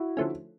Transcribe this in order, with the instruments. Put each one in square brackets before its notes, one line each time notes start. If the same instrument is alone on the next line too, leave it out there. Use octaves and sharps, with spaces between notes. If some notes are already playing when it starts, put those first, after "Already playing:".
Already playing: [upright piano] E4 F#4
[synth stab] D3 F3 A3 C#4